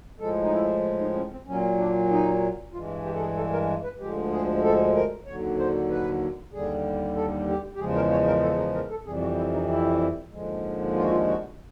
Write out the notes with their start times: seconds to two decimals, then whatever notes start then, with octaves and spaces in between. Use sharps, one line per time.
0.20 A2 F3 G#3 A4
0.42 D#4
0.52 E4
0.99 D#4
1.15 C#4
1.31 C4
1.47 A#2 F#3 C#4
1.78 D4
2.10 D#4
2.73 G2 E3 G#3 F4
3.05 G4
3.15 A4
3.21 G#4
3.37 A4
3.53 A#4
3.83 B4
4.00 D2 D3 F3 G#3 G4
4.32 G#4
4.64 A4
4.95 A#4
5.26 D#2 D3 F#3 C#5
5.58 C5
5.90 B4
6.53 D#2 D3 G3 G#4
7.16 A4
7.48 G4
7.75 G4
7.79 E2 C#3 F3 G#3 G#4
7.95 A#4
8.11 C#5
8.27 A#4
8.43 A4
8.58 A#4
8.75 A#4
8.90 A4
9.07 F2 C3 E3 G3 G#4
9.22 F#4
9.38 E4
9.54 D#4
9.70 E4
10.32 D#2 D3 F3 G#3
10.96 F4
11.03 F#4
11.11 F4
11.27 F#4